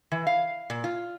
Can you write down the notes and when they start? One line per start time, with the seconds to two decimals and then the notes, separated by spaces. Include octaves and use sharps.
0.12 E3
0.27 F5
0.70 A#2
0.84 F4